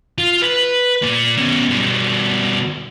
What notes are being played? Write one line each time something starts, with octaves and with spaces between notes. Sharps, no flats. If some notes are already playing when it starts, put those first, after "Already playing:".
F4
B4
A#2
B2 C#4
B2 G3